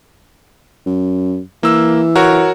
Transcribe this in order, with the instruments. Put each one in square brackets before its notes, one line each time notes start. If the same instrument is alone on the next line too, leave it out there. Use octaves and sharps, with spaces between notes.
[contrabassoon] F#2
[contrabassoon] E3 [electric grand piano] A#3 E6
[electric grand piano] F#4 A#4 C#5